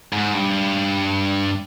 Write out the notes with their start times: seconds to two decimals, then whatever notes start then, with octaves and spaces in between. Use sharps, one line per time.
0.13 G#2
0.33 G2